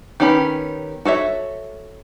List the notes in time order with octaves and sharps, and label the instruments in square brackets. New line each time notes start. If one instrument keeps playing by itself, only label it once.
[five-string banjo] D#3 B3 C#4 G4 B5
F#4 A4 C#5 E5